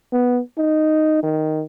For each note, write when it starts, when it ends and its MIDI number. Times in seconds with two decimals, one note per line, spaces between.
0.12 0.40 59
0.58 1.21 63
1.23 1.63 51